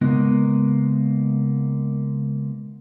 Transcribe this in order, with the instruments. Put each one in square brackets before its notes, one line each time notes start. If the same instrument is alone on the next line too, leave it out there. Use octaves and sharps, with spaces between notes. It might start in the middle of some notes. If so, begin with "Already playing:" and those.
[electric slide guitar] C#3 G#3 A#3 B3 D#4